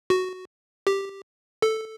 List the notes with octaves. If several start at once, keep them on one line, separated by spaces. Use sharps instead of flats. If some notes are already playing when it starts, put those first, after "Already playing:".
F#4
G4
A4